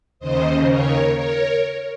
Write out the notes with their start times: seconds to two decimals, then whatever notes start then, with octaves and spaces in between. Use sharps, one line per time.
0.19 D#2 C#3 C5 D#5
0.69 A#4 C#5
1.18 A#4 C#5